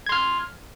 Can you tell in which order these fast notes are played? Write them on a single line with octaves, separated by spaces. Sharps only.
G#6 C6 F6